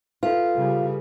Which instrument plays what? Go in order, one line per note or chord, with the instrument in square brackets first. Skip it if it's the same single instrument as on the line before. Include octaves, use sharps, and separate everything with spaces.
[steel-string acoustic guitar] F4 [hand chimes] A4 B4
[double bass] C#3 G3